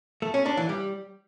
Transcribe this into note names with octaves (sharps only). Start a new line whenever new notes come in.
A3
C#4
D4
E3
G3